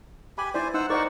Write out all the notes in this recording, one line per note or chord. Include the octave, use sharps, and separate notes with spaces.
G4 G#5 B5
E4 C5 D5 G#5
D#4 C5 F#5 E6
D#4 A#4 C5 D5 F#5 C#6